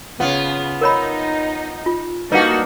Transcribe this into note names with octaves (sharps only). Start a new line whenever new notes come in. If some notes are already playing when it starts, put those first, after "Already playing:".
C#3 B3 F4
D#4 A#4 C#5 B5
F4
G3 A#3 D4 D#4 F#4 B4 F5